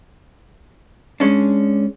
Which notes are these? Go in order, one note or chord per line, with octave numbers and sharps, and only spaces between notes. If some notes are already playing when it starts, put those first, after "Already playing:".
G#3 C#4 D4